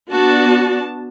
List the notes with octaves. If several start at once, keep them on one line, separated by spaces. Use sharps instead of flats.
B3 D4 F#4 A5